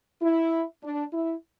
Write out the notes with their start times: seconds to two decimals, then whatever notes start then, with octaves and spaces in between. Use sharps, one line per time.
0.21 E4
0.83 D4
1.13 E4